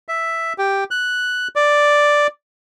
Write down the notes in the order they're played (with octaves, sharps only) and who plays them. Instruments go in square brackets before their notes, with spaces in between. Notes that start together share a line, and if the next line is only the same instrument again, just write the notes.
[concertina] E5
G4
F#6
D5